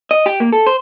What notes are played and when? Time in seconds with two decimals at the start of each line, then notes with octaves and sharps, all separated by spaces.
0.11 D#5
0.26 G4
0.40 A#3
0.53 A4
0.66 C5